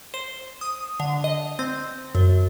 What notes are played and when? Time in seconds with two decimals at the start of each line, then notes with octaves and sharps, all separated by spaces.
0.14 C5
0.61 D#6
1.00 D3
1.24 D#5
1.59 C4
2.15 F#2